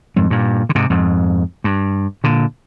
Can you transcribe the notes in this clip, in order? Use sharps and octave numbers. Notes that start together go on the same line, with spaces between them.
F2 G#2
G2 A#2
D3
G#2 C3
F2 G#2
G2
A#2 D3